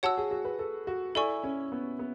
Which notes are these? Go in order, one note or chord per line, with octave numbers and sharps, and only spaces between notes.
F#4 C#5 F#5 A5 E6
G#4
F#4
B4
A4
F#4
E4 A4 D5 G#5 C#6
C#4
B3
B3